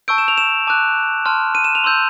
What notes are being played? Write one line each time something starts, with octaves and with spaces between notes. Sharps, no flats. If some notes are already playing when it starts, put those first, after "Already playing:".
A5 C#6 E6 G6 D7
E7
F7
E7
A5 D6 F#6
A5 C6 F6
D#7
E7
F7
C6 E6 G6